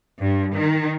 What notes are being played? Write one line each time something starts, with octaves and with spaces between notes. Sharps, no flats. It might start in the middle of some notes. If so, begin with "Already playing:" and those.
G2
D#3